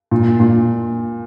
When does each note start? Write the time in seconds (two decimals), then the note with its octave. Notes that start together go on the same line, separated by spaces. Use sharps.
0.11 A#2
0.40 A#2